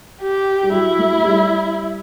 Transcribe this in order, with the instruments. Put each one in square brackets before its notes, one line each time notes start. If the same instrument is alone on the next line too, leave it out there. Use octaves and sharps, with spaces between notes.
[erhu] G4
[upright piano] G3
[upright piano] F#3 [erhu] E4
[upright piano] A3
G3